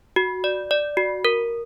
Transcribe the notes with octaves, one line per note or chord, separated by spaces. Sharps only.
F#4
D5
D5
F#4
A#4